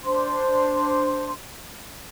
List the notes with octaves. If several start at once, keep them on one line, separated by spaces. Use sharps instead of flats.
D4 C5 C6